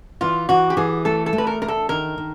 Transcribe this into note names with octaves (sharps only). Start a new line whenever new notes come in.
E3 F4
E3 F#4
G4
E3 G#4
A3 A4
A4
A3
B4
A#4
D4 A#4
A4
D#3 A#4
D#3